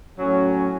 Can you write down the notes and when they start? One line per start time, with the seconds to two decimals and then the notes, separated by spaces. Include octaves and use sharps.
0.17 A2 F#3 C#4